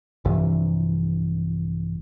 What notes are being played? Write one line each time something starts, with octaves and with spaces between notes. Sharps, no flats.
A#1 G2 C3 E3